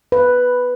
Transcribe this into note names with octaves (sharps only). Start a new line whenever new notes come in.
B4